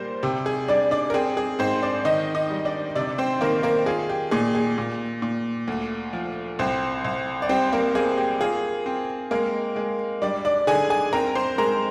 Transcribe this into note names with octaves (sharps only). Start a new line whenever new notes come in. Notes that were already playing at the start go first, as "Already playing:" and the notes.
Already playing: A#2 G3 A#4 C5
C3 G4
G#4
G3 D4 D5
D4 D5
A#4
C4 G#4
G#4
G#2 C4 C5
D4 D5
D#3 D#4 D#5
D#4 D#5
G3
D4 D5
C3 D4 D5
C4 C5
D#3 A#3 A#4
A#3 A#4
F4 G#4
G4
A#2 G#4
G#4
A#2
A#2
D2
F3
C2 C4 C5
C2
D5
G3 C4 C5
A#3 A#4
A#3 G#4
G4
F4 G#4
C4
G#3 A#3 A#4
G#3
G3 D4 D5
D4 D5
D3 G#4 G#5
G#4 G#5
C4 A#4 A#5
C5 C6
G#3 A#4 A#5